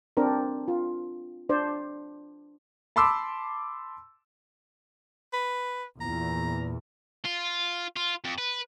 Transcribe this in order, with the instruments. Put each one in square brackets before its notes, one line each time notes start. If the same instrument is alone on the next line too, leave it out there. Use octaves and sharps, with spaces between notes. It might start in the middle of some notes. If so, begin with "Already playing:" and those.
[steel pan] C4 D4 A#4
F4
D4 C5 D5
[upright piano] A5 B5 C6 D6 E6
[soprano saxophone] B4
[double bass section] E2 A#2 [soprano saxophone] A#5
[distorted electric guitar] F4
F4
F2
B4